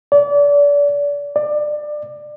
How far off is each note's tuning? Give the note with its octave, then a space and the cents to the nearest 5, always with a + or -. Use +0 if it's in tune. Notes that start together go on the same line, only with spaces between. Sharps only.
D5 -30
D5 +25